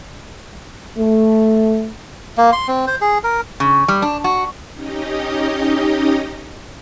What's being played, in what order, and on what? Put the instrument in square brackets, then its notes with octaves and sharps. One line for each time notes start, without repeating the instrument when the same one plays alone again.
[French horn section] A3
[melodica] A#3
C6
C4
C5
G#4
A#4
[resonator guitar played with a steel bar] C#3
G3
D4
F#4
[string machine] C#4 D#4 G4 D#5